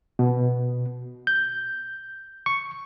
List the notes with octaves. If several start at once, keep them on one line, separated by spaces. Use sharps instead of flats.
B2
G6
C#6